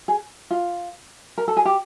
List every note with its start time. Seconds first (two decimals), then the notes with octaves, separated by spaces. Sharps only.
0.08 G#4
0.51 F4
1.38 A#4
1.48 A4
1.57 G#4
1.65 G4